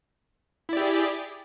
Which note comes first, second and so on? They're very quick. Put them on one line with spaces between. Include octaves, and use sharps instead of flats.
E4 D5 G4 G#4